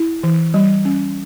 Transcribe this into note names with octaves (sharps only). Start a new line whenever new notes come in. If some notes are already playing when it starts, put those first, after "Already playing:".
Already playing: E4
E3
G3
C#4